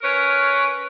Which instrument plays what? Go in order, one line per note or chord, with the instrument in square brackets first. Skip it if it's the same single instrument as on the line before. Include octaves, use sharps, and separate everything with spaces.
[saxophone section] C#4 A#4 B4 C#5